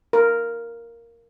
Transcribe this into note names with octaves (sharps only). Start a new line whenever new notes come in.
A#4